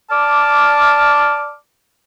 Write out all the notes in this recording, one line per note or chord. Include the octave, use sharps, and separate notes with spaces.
D5 A5 D6 F6